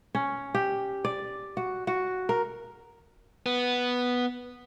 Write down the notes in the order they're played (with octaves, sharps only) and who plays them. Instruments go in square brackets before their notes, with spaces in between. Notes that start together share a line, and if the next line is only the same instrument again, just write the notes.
[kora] C#4
G4
D5
F#4
F#4
A#4
[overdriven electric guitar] B3